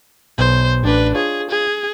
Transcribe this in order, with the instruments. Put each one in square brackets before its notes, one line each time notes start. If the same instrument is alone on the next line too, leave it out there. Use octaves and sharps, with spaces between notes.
[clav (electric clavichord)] B1 B2 [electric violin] C5
[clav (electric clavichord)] A1 D5 [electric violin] D4 B4
[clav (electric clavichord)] F4 C#5 D#5 [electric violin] G#4
[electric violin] G#4